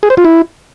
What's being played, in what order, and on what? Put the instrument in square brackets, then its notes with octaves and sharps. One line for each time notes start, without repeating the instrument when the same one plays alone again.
[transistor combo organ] G#4
C5
F4
E4